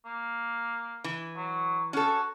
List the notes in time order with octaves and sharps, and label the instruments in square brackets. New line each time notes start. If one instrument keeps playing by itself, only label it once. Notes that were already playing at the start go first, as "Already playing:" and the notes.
[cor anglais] A#3
[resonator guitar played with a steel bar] E3
[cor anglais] F#3
[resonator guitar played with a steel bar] C#4 A4 [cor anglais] F#4